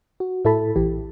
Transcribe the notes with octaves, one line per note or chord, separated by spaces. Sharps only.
F#4
A2 E4 A4 A5 B5
A#1 E3 G4